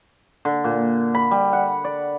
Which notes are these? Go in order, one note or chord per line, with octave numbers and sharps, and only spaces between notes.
D3
A#2
B5
G3
F#5
D5